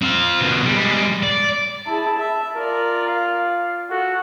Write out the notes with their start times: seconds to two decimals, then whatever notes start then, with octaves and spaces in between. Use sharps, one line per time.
0.02 C4 F4
0.41 B2 D3
0.66 G3 G#3
1.23 D5
1.87 E4 G#4 A5
2.18 E5
2.55 F4 A#4 D5
3.07 F5
3.90 F#4 A4